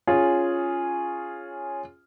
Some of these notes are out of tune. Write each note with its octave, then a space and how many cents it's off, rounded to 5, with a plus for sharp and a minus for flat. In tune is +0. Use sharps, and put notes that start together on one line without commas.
C#4 +0 F4 +0 G#4 +0